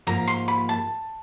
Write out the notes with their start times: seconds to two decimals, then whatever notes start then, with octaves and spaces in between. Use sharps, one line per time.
0.07 G#2 F3 A#3 A#5
0.28 C6
0.48 B5
0.69 A5